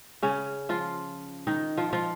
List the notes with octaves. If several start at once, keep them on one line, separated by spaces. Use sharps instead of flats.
C#3 C#4
F3 F4
D#3 D#4
F3 F4
F3 F4